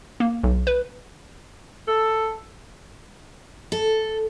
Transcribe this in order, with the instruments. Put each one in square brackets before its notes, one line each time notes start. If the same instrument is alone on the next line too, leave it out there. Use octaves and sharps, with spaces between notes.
[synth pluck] A#3
B1
B4
[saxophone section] A4
[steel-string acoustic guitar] A4